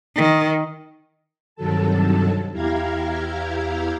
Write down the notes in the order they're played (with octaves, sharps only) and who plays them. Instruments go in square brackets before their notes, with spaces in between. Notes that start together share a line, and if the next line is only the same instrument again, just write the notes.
[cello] D#3
[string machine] G2 C3 D#3 F#3 A4 A5
E2 E4 G4 F5 A#5 G#6